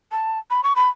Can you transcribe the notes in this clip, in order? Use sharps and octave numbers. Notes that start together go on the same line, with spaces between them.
A5
B5
C#6
B5